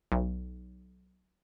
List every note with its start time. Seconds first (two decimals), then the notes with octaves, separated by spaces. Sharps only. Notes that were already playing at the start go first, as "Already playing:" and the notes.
0.12 B1